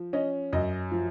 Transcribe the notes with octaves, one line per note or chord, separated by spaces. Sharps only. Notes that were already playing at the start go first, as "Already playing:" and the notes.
Already playing: F3
C#4 D#5
F#2 D#5
F3